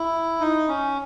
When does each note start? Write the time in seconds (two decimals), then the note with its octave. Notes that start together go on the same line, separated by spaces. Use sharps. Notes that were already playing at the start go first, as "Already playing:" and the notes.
Already playing: E4
0.40 D#4
0.68 C#4